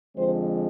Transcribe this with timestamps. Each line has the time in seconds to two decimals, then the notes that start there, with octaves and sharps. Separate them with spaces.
0.16 F2 D3 F3 G#3 C4 C5